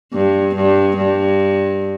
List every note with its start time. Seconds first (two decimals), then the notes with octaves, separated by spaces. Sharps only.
0.14 G2
0.55 G2
0.97 G2